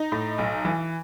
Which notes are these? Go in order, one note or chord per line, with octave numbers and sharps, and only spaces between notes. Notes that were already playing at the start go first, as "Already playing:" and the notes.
Already playing: D#4
A2
B1
E3